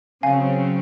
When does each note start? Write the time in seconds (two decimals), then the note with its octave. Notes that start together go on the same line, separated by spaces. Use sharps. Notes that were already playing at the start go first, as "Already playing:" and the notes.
0.23 C#3 F#3 C4 F5 G#5